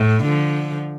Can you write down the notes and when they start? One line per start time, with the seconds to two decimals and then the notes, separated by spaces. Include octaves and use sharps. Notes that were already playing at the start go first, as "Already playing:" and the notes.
Already playing: A2
0.24 D3 F3